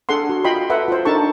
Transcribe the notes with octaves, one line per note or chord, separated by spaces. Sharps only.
D4 G#4 A4 F#5 C6
F#4
F4 D#5 G5 B5 C6
A4 B4 E5 F#5
F4 C5
D4 D#4 A4 A#4 A5 C#6